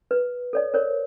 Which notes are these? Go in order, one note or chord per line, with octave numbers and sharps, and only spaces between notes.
B4
A4 C#5 D5
A#4 C5 C#5